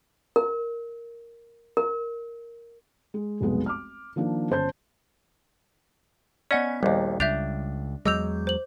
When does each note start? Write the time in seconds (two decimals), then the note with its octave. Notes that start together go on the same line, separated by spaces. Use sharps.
0.36 A#4
1.77 A#4
3.14 G#3
3.41 F1 B1 G#3 B3
3.66 D6 F6
4.16 D#3 F3 A#3 D4
4.50 G1 C#4 C5 A5 G6
6.51 B3 C#4 D5 D#5 F#5 G#5 B6
6.83 A#1 D#2 G3
7.20 C#2 D4 E5 G6 F7
8.06 E2 F#3 G#3 D#5 D6 E6 G6 F7
8.47 C5 F#7